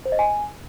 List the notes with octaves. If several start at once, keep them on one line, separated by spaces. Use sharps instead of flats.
C5
D#5
G#5